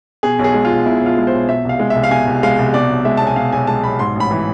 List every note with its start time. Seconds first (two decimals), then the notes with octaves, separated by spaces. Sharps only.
0.23 B2 G#4
0.39 B1
0.44 G#4
0.54 G#3
0.65 F4
0.70 B1
0.86 B2 E4
1.01 B1
1.06 F4
1.17 G#3
1.27 C5
1.33 B1
1.49 B2 E5
1.65 C2 F5
1.80 G#3
1.90 E5
1.95 C2
2.04 F5
2.11 B2 G#5
2.27 C2
2.43 G#3 F5
2.59 C2
2.74 B2 D5
2.90 B1
3.05 G#3 E5
3.17 B1 A5
3.27 G#5
3.36 B2 F5
3.52 B1 G#5
3.67 G#3 A5
3.84 B1 B5
3.99 G#2 C6
4.16 A1 B5
4.31 E3